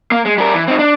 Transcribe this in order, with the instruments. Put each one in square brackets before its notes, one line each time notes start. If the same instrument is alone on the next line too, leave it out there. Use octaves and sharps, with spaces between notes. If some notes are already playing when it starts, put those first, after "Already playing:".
[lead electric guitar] A#3
G#3
G3 A#4
E3
C4 D#4
D4